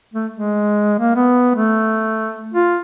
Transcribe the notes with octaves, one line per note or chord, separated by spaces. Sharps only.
A3
G#3
A#3
B3
A3
F4